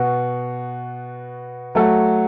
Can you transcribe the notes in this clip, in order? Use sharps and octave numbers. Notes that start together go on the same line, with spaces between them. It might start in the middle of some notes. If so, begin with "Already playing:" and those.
Already playing: B2 B3 F#4
F#3 A3 F#4 A4